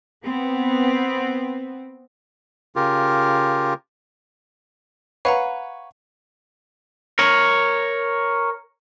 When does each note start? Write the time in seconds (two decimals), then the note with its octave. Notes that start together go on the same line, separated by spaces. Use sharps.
0.24 B3 C4
2.76 C#3 F4 G4 A#4
5.25 B4 C#5 F5 F#5 A#5
7.19 A#4 C#5